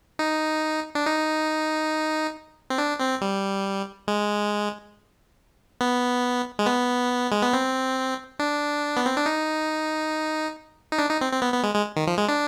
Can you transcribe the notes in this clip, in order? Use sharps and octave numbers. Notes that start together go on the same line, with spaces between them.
D#4
D4
D#4
C4
D4
C4
G3
G#3
B3
G#3
B3
G#3
B3
C4
D4
B3
C4
D4
D#4
D#4
D4
D#4
C4
C4
B3
B3
G#3
G#3
D#3
F3
G#3
D4